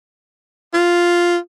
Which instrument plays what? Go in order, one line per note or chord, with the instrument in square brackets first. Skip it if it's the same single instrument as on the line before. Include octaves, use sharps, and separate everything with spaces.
[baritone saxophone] F4